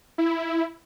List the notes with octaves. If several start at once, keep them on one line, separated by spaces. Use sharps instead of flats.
E4